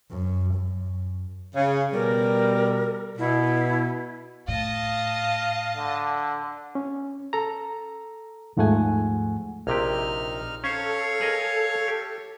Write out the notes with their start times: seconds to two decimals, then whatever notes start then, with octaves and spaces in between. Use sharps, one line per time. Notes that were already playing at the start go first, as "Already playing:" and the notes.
0.11 F#2
0.54 F#2
1.55 C#3
1.93 B2 G3 A#4
3.18 B2 E4
4.48 A2 D#5 F5 A5
5.77 D3
6.75 C#4
7.33 A4 A#5
8.57 D#2 G#2 F3 A3 F#5 G#5
9.67 A#1 C3 D#4 G4 F6
10.64 C#4 A4 C5 C#5 F5 C#6
11.21 G#4 A#4 D#5
11.88 G4